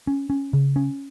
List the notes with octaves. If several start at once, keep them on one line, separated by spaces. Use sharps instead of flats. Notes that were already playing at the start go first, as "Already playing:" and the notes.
C#4
C#4
C#3
C#4